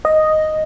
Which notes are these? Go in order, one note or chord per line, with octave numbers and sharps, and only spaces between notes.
D#5